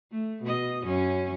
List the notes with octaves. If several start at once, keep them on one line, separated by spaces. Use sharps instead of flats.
A3
B2 D#5
F#2 C#4